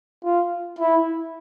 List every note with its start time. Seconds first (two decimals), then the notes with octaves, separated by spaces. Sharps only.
0.24 F4
0.79 E4